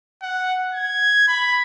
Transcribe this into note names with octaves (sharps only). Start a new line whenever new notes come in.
F#5
G#6
B5